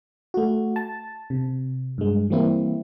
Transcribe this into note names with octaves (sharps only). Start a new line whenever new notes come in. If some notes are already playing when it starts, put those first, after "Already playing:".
A3 F#4
A5
C3
G2 G#3
E3 G3 A#3 C4 E4